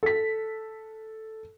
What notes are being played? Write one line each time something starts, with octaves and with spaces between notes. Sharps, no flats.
A4 B6